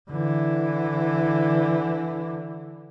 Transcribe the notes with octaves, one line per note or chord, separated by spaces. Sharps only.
D3 E3